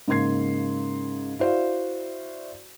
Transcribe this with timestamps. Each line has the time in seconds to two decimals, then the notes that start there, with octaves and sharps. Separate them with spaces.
0.08 G#2 C#3 A#3 C6 G#6 C7
1.39 E4 F#4 C5 D5 F5